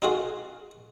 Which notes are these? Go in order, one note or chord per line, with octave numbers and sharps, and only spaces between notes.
D#4 F4 F#4 G#4